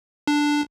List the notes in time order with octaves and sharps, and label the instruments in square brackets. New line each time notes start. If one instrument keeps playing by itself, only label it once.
[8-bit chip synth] D4